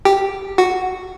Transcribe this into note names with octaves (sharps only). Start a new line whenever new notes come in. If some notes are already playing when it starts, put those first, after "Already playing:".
G4
F#4